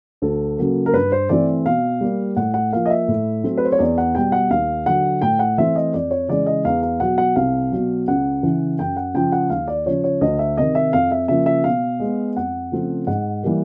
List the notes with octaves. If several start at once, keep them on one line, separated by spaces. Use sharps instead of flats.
D2 A4
C#3 F#3 A#3
A#4
G2 B4
C5
E3 A3 C4 D5
B2 F5
G3 A#3
A2 F#5
F#5
F3 A#3 F5
D#5
E5
A2
F#3 A3 C4
B4
C5
C#5
E2 D5
F#5
B2 G3 G5
F#5
D#2 F5
D3 F#3 F#5
A2 G5
F#5
E3 A3 C4 E5
D#5
F2 D5
C#5
C#3 E3 G#3 D5
D#5
E2 F5
F5
B2 F#3 F#5
F#5
C2 F5
B2 F#3
C#2 F#5
C#3 E3
F#2 G5
F#5
C#3 F3 G5
F#5
D#2 F5
D5
C#3 F3 C#5
C#5
D2 D#5
E5
C3 D#3 D#5
E5
F2 F5
E5
C#3 F3 A#3 E5
E5
B2 F5
G#3 B3
F2 F#5
C#3 F3 A3 C4
G#2 F#5
E3 G3 A#3